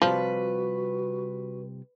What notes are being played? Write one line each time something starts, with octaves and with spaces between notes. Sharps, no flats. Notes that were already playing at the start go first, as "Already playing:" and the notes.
C3 F3 G3 F4 F#4 B4